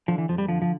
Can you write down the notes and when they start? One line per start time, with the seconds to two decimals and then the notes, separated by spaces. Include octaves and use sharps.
0.08 D3 F3
0.18 E3
0.29 F2 F3
0.38 G3
0.48 D3 F3
0.62 F3